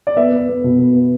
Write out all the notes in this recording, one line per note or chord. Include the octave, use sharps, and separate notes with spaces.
D5
B3 E5
B3
B3
B2
B3
B3